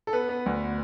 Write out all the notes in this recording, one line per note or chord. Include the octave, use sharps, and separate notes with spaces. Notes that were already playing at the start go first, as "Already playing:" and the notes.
A4
B3 B4
B3
D2